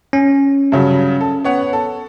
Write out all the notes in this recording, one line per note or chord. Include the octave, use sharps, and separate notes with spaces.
C#4
G2 C#3 F#3
A4
B3 C#5 F#5
A4